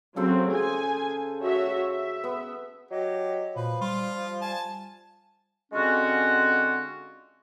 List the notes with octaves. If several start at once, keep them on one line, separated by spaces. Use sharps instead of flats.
C#3 F#3 C4 A4 C5
G#4 G#5
F#4 C#5 E5
E5
B3
F#3 G4 D#5
A#2 F3 B4
G3 F4
G#5 A5
D3 G#3 C4 C#4 F4 F#4